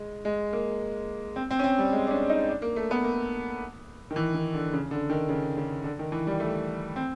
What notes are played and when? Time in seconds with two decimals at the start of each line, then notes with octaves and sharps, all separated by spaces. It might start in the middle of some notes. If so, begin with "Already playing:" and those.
Already playing: G#3
0.25 G#3
0.53 A#3
1.36 C4
1.50 C4
1.59 C#4
1.64 C4
1.79 G3
1.93 G#3
2.07 D4
2.11 C#4
2.30 D#4
2.49 D4
2.62 A#3
2.76 A3
2.91 B3
3.04 A#3
4.11 D#3
4.16 E3
4.35 D#3
4.54 D3
4.73 C#3
4.91 D3
5.10 D#3
5.29 C#3
5.57 C#3
5.84 D3
5.99 D#3
6.12 E3
6.27 G3
6.40 A3
6.96 C4